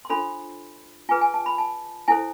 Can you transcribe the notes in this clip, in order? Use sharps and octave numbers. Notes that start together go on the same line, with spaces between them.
C6
D4 F4 A4 C5 B5
F4 G#4 B4 G#5
G#5
A5
B5
A5
E4 A4 C5 G#5